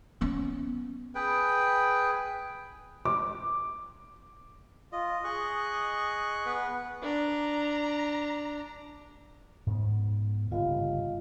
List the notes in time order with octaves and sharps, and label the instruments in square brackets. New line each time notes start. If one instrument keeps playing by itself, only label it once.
[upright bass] B3 C#4
[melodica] G#4 B4 G5
[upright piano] D6
[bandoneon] F4 [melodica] D#5
[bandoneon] G#4 C#6 F#6
[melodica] B3 B4
[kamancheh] D4 A#5
[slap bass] G#2 B3
[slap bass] G1 A#2 C#3 [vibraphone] F4 D#5 F5